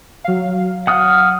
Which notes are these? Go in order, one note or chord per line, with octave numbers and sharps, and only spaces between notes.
F#3 F5
F#5 D#6 F6